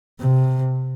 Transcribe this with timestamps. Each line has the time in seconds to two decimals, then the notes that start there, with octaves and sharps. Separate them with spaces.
0.20 C3